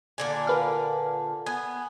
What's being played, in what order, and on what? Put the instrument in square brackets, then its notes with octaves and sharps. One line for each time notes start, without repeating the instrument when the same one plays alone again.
[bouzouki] A#2 D3 G#5
[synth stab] A#4 B4 F5
[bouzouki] B3 [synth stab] G#5